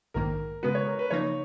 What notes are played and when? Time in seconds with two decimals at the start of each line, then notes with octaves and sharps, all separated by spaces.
0.14 A#1 G#2 D#3 A#3 A#4
0.63 C#3 G#3 B3 F#4 B4
0.75 C#5
0.87 A#4
0.99 B4
1.10 C#3 F3 A#3 D#4 C#5